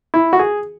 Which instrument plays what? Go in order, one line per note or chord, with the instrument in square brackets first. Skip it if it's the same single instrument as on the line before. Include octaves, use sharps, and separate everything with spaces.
[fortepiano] E4
F#4
G#4